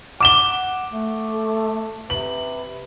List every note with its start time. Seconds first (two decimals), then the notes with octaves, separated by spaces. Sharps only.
0.21 F#5 D6 E7 G7
0.92 A3
1.34 A4
2.10 C3 B4 F#7